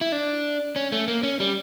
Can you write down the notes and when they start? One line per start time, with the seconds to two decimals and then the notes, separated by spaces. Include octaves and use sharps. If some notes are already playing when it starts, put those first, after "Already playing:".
0.01 E4
0.12 D4
0.76 C#4
0.92 A3
1.08 A#3
1.23 C#4
1.40 G3